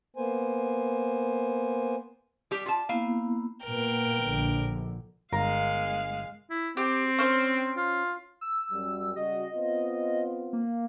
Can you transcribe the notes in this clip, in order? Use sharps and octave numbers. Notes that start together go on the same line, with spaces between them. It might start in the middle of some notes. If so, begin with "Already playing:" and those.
A#3 B3 C5 G#5
G3 G4
F4 A5
A#3 B3 E4 F5
A#2 A#3 B3 A#4 G5
A#1 D3
G1 G#3 A#4 F5
E4
C4 G4
C#4 C5
F4
E6
F#2 G3
C#3 G3 F#4 D#5
B3 C4 F4
A#3